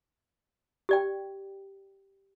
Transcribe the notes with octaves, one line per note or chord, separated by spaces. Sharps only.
G4 D5 G5